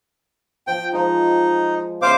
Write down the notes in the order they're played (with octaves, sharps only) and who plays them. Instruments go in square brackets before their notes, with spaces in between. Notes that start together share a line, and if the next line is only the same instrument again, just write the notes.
[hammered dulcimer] F3 [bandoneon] G5
[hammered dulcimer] F3 G#3 [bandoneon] D#4
[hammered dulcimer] C#3 D#4 E4 [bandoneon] C5 F5 D6